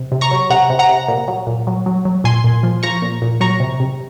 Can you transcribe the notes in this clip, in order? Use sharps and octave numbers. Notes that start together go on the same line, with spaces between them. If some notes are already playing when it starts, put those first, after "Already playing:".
Already playing: C3
C3
A#5 C#6
F#3
C3 F#5 A#5
C3
F#5 A#5
C3
A#2
F#3
A#2
F#3
F#3
F#3
A#2 G#5 C6
A#2
F3
F3 A#5 C#6
A#2
A#2
F#3 A#5 C#6
C3
C3